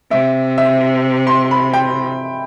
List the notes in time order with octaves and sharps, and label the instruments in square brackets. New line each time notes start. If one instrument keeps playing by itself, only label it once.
[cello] C3 [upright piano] E5
[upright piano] E5
C6
B5
G5